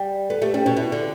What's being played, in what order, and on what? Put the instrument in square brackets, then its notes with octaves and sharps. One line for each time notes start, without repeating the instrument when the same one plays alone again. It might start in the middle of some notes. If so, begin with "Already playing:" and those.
Already playing: [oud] G3
[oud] B3 [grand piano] A4
[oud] A3 [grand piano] G4
[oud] G3 [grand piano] C#4
[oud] B2 [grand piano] C#4
[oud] B2 [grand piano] E4
[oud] D3